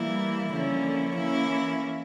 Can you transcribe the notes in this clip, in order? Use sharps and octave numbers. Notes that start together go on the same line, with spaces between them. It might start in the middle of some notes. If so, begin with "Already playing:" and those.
Already playing: E3 G3 A#3 E4
D3 F3 A#3 C#4 E4
E3 A#3 C#4 E4